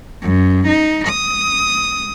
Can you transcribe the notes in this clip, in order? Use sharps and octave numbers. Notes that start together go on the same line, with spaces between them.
F#2
D#4
D#6